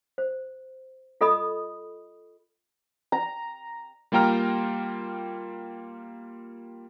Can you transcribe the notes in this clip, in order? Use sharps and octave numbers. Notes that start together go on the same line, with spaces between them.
C5
F4 A4 D#5 B5 D#6
A#5
G3 A#3 F4 G5 A#5 F6